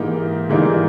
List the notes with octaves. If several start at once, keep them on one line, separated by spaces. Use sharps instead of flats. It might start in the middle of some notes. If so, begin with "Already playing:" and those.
Already playing: G#2 E3 A#3 D#4 G4
G#2 E3 G3 A#3 D#4